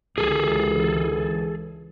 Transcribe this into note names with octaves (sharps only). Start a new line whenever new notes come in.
C#2 D3 E3 G#4 A4